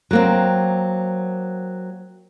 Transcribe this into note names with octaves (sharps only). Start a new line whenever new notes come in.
F#3 A#3 C4